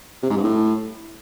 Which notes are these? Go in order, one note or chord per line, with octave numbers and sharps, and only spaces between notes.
C3
G#2
G2
A2